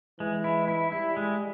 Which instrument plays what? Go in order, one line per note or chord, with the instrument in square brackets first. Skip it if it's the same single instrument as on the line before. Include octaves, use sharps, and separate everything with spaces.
[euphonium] E3 [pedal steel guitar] G#3
[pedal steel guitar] E4
E4
[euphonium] G3 [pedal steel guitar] E4
[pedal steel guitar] G#3